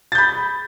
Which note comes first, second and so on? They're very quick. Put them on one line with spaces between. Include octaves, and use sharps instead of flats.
A6 G6 B5